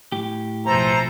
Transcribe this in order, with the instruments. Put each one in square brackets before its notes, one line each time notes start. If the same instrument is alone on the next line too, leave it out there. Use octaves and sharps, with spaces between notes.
[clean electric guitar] A2 G4
[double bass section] A#1 F2 B2 [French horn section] E3 A4 C5 [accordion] A#5